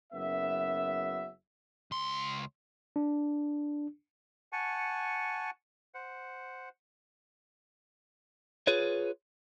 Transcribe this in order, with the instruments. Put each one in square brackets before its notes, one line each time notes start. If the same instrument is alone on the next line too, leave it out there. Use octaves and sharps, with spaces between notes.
[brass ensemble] F#1 F#2 B3 E5
[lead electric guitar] C#2 C6
[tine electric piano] D4
[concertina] F#5 G#5 A5 C#6
C5 F#5
[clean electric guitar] F4 G#4 B4 C#5